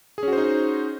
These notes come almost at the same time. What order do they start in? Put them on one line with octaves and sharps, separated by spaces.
G#4 C#4 F#4 C5 D#4